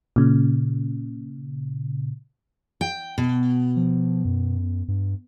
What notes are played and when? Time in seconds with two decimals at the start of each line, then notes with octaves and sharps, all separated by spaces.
0.16 A#2 C#3
2.81 G5
3.18 B2
3.76 F3
4.25 F#2
4.88 G2